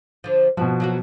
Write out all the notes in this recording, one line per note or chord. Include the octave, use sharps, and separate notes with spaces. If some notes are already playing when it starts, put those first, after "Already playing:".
D3 F3
B2 F3 F#4
F#3 A#3 F#4